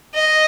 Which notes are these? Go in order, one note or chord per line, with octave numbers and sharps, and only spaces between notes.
D#5